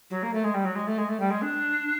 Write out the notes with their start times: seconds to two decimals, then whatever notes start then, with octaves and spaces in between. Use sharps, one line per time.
0.10 F#3
0.22 A#3
0.33 A3
0.43 G#3
0.53 G3
0.64 F#3
0.75 G#3
0.86 A3
0.97 G#3
1.08 A3
1.19 G3
1.30 G#3
1.41 D4